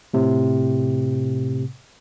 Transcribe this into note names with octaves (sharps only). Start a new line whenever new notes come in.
A2 C3